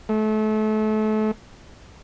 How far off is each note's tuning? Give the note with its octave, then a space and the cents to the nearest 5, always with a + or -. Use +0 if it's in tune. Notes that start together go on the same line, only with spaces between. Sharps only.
A3 -30